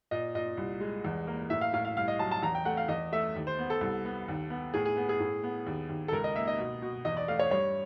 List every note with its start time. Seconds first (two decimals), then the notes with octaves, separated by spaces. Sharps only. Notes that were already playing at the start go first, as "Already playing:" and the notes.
0.11 A#2 D#5
0.35 A#2 D#5
0.57 C2
0.80 G#3
1.05 E2
1.27 A#3
1.50 A2 E5
1.61 F5
1.73 A2 F5
1.85 F5
1.96 C2 F5
2.08 D#5
2.19 F#3 A5
2.31 A5
2.43 E2 A#5
2.55 G5
2.65 A3 F#5
2.77 F5
2.88 E2 D#5
3.12 A3 E5
3.36 D#2
3.47 C5
3.59 B3
3.70 A4
3.81 C2
4.05 B3
4.28 D#2
4.50 B3
4.74 A2 G#4
4.85 G#4
4.97 B3
5.09 G#4
5.20 A2
5.43 B3
5.66 D#2
5.89 D#2
6.08 A4
6.12 C#2 A#4
6.24 D#5
6.35 A#3 E5
6.47 D#5
6.58 B2
6.82 B2
7.05 E2 D#5
7.17 D5
7.28 A3 F5
7.39 C#5
7.51 G2 C#5